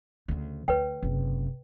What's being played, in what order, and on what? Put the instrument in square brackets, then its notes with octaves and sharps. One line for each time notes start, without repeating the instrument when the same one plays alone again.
[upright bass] D2 C#3
[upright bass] D2 [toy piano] B4 C#5 G5
[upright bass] F#1 C3